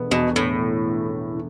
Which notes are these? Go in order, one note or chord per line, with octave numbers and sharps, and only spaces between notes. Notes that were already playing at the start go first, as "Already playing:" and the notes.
Already playing: E1 E2 D3 B3
E2 B2
A2 D3
E1
B3
E2
D3